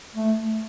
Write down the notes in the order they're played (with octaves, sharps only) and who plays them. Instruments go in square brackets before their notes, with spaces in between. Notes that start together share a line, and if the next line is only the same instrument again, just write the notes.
[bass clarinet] A3